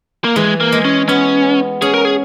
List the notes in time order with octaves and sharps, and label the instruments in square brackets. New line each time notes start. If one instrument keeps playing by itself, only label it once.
[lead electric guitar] A#3
[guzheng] E3 [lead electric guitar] G#3
[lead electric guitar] A#3
[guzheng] G#3
[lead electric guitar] C#4
[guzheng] B3 [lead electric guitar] C#4
[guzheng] C#4 [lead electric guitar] G#4
[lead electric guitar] A#4
G#4